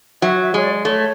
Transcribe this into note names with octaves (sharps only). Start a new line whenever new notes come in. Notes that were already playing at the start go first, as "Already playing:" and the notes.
F#3 E5
E5
G#3 C#5
D5
A3 C#5